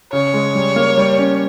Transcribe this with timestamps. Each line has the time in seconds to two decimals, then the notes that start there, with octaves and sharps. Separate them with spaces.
0.12 C#3 C#5
0.34 G#3
0.55 G3
0.76 A#3
0.97 G3
1.19 C#4